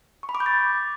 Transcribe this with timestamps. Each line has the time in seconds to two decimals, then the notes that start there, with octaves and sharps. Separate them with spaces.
0.23 C#6
0.29 B5
0.35 D6
0.40 G6
0.46 A6